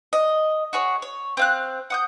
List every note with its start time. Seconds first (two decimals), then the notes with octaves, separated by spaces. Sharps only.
0.13 D#5
0.73 F#4 G#4 C#5
1.02 C#5
1.37 C4 F5 F#6
1.90 F#5 D#6 G6